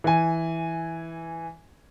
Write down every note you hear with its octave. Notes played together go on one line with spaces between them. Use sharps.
E3 G#5